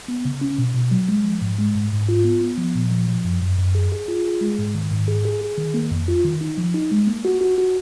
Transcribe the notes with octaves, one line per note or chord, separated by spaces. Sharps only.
B3
C#3
C#4
B2
B2
F#3
G#3
F3
G#2
G#3
G#2
G#2
F4
B3
B3
F3
A#2
F3
F3
F#2
F#2
F#2
G#4
G#4
F4
G#4
G#3
G#2
D#3
G#2
G#4
G#4
G#4
D#3
A#3
F2
F4
D#3
D#4
F3
D#4
G#3
A#3
F#4
F#4
F#4